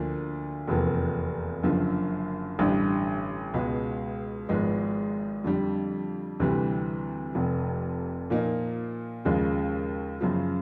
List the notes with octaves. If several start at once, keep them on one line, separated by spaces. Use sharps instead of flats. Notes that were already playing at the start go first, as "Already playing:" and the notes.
Already playing: D2 D3 F3 A#3 D4
F1 E2 C3 F3 A#3
F#1 F#2 D3 F3
A1 G2 D3 G3
C#2 B2 G#3 B3
G#1 G#2 F3 G#3 B3
F2 D3 G3
D2 C3 E3 G3
F1 F2 C3
A#2 F3 A#3 D#4
D#2 C#3 F3 G#3
F#2 C#3 F3